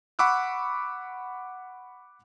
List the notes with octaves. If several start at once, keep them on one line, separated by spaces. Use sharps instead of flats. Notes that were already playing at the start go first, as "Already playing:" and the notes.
F#5 B5 C#6 D6 E6 F#6